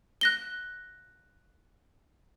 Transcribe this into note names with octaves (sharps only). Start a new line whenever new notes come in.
F#6 A#6 G7